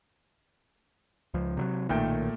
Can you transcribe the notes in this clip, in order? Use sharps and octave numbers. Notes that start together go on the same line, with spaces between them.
C#2 F3
C3 F3 F#3
B1 A#2 D#3 A3 G5